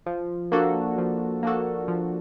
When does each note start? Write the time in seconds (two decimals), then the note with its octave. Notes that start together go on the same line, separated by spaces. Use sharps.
0.06 F3
0.52 A#3 D4 F#4 A4
0.98 F3
1.43 A#3 D4 F#4 A4
1.88 F3